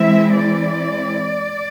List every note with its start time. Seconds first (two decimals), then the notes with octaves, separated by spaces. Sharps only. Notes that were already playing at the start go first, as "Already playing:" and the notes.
Already playing: E3 G#3 C4 E4 E5
0.35 D5